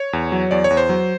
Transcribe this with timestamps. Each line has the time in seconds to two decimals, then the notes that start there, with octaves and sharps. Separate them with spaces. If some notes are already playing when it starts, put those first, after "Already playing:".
Already playing: C#5
0.13 E2
0.32 F#3
0.51 E2 D5
0.64 C#5
0.70 E2
0.77 C5
0.89 F#3